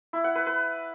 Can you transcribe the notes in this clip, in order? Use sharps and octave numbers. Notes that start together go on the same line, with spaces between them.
E4
F#5
B4
B4